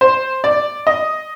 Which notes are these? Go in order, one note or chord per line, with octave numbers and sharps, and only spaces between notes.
C5
D5
D#5